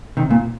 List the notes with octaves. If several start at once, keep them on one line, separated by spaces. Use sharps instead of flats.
C3 D#3
A#2